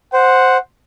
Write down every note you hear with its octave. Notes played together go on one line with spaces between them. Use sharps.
C5 F#5